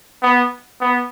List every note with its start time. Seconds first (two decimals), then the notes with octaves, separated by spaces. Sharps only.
0.23 B3
0.81 B3